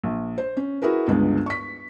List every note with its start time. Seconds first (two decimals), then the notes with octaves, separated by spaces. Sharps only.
0.04 A#1
0.38 C5
0.57 C#4
0.82 E4 F#4 G#4 A#4 B4
1.08 C#2 G2 D3 G#3 B3
1.46 C#6 B6